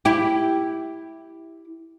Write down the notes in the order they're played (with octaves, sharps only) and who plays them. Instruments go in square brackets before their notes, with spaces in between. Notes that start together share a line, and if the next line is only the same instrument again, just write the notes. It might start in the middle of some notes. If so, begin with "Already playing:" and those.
[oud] E4 G4